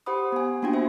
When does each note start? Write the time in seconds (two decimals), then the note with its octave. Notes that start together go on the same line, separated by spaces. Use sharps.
0.06 G4 C5 F#5 B5 D#6
0.32 B3 G#5
0.62 A#3 B3 D4 F4 F#4 G5
0.74 B3 C5 E5